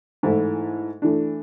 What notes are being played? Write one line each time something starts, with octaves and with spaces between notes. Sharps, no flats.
G#2 E3 A3 E4
E3 A3 D4